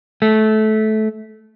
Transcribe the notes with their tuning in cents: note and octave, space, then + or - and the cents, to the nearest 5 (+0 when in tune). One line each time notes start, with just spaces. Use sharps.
A3 -20